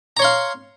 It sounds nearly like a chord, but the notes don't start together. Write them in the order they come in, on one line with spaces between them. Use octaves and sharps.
A#5 C#5 C6 F5